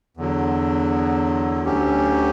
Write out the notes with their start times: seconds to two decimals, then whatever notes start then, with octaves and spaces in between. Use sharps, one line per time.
0.17 E2 D3 F#3
1.64 D2 D3 F#3 C#4 G4